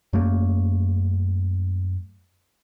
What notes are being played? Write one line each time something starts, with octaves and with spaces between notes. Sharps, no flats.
F#2 A3 A#3